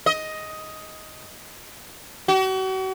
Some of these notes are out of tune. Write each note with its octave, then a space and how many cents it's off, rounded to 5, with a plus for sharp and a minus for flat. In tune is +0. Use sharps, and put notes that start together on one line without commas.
D#5 +10
F#4 +40